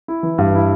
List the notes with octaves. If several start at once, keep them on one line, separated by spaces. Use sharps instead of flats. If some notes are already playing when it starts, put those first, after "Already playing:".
E4
E3
G2
E4